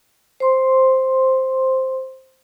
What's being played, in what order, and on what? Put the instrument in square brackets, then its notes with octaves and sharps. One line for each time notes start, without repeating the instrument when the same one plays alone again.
[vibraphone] C5 C6